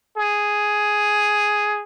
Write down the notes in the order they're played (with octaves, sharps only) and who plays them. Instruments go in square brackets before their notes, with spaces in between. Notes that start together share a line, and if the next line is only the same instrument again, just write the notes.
[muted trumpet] G#4